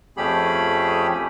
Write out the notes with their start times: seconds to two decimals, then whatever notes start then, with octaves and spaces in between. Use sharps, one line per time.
0.17 F2 A3 C#4 G4 G#4 B5